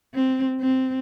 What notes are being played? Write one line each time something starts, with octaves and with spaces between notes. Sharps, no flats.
C4
C4